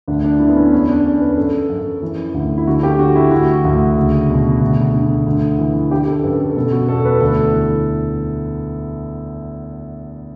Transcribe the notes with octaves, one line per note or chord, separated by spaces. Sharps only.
D2 D4
D4
D3 E4
B3
C#4
E2 C#4
D4
E2 C#4
B4
F#2 A4
F#2
E3
D2
E4
D3 F#4
G4
D3 F#4
E4
D2 F#4
D2
C#2
B2
D2
D3
D2
E3
D3 G4
A4
F#2 B4
A4
B2 A4
F#4
E2 A4
B4
D2 A4
E3